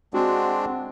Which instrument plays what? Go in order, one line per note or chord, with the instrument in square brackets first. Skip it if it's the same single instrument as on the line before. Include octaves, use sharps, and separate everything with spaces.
[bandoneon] G#3 C4 D4 [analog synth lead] F#4